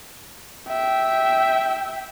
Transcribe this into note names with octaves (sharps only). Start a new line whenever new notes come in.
E5 G5